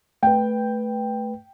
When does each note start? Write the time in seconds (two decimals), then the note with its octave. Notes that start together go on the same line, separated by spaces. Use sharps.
0.23 A3 B4 G5